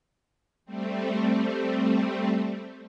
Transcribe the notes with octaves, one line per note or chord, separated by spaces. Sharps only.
G3 A3 C4